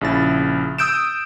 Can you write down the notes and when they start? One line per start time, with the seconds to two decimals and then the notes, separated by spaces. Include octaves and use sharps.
0.01 A#1 C#3 E4 A6
0.78 D#6 E6 G6 D7 E7